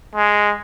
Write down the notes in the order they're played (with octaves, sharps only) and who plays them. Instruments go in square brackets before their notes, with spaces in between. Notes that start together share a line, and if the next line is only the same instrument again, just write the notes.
[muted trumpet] G#3